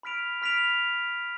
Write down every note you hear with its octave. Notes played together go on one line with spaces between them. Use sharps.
B5 F6 B6 D7 F7
B5 F6 B6 D7 F7